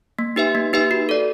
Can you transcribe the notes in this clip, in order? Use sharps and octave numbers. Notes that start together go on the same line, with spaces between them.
A#3
D#4 G4 B4 E5
A#3
D#4 G4 B4 E5
F#4
A4 D5